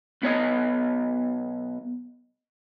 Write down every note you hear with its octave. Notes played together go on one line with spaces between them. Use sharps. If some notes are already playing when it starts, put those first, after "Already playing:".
B1 B3 C#5 D#5